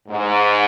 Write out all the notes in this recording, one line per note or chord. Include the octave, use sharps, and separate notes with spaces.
G#2